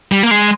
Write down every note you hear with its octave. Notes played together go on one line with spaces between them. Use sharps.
G3
A#3
G#3